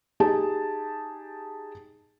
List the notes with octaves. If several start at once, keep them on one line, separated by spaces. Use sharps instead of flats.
D#4 G4 G#4 A5